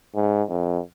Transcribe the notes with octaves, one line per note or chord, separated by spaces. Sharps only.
G#2
F2